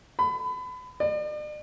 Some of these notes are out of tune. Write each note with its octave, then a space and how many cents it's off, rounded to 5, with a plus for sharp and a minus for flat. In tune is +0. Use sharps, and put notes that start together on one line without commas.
B5 +30
D5 +45